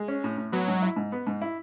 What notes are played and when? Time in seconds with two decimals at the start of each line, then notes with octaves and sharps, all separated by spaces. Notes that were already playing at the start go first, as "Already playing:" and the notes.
Already playing: G#3
0.08 C#4
0.24 A2
0.38 A2
0.52 F#3 B3
0.68 G#2
0.82 E4
0.96 G#2
1.12 B3
1.27 G#2
1.42 E4